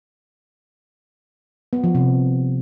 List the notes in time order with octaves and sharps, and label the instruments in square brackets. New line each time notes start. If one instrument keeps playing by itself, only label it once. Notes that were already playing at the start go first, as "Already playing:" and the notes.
[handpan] B3
F3
C3